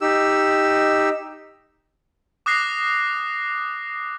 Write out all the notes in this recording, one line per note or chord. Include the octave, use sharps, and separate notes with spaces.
D#4 G4 E6
D6 D#6 F#6 A#6 C7